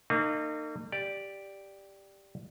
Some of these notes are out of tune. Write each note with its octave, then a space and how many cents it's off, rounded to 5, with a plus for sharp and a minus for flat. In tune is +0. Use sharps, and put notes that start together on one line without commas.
A#3 -40 D#4 -30
G4 +0 D5 +0